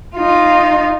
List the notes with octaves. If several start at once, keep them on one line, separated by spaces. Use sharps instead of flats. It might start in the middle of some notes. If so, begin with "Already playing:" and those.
D#4 F4